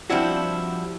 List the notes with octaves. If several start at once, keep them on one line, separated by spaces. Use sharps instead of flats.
F3 G3 C4 D4 E4 F#4